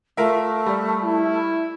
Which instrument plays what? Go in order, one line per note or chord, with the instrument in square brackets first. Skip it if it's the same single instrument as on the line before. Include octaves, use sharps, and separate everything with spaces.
[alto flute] A3 [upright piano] F4 A#4 E5
[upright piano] G3
[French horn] E4